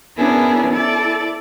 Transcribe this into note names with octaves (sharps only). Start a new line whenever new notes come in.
B3 C#4 D4 E4 G#4 A#4
E4 A4 D5 A6